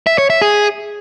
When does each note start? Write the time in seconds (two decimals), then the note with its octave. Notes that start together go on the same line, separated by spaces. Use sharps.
0.07 E5
0.18 C#5
0.30 E5
0.42 G#4